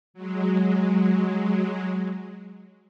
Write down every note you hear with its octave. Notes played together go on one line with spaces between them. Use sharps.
F#3 G#3